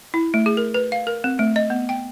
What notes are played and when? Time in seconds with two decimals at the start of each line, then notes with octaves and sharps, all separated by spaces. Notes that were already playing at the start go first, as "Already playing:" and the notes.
0.14 E4
0.34 A3
0.46 G#4
0.57 A#4
0.74 B4
0.92 F5
1.07 A#4
1.24 C4
1.39 A3
1.56 D#5
1.70 B3
1.89 G5